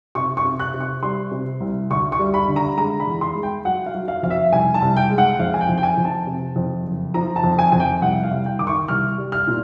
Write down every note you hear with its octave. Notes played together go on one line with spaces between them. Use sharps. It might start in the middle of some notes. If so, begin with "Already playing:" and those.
C3 C#6
C#6
C3
F#6
C3
C#6
G3 C6
C3
C2
D2 C#6
C#6
G3
B5
D3
A#5
G#3 A#5
B5
E2
C6
G#3
G5
F#3 F#5
F5
F#3
F5
F2 F5
E5
C2 G#5
A5
C2
G5
G#3
F#5
F2 F5
G#5
G5
F2
G5
G#5
F2
A5
C3
F2
F#1
F3 A#5
A5
F2
G#5
F2 G#5
G5
C2 F#5
F5
C2
G5
D#3 D6
C#6
C2 F6
G3
F6
A#2